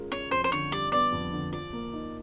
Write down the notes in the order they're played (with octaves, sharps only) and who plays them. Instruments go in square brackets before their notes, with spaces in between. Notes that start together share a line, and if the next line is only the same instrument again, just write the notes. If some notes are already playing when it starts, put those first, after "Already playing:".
Already playing: [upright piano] G#3 C#4 F4 A#4
[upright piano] C#4 [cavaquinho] C#5
[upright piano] F2 [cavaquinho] C5
[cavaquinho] C5
[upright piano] D3 [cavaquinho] C#5
[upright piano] G3 [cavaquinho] D5
[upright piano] B3 [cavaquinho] D5
[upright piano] F2
D3
[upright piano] F3 [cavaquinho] D5
[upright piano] A#3
D#4